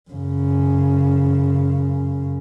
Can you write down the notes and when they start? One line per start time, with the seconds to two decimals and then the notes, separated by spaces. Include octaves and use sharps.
0.11 F#2 C#3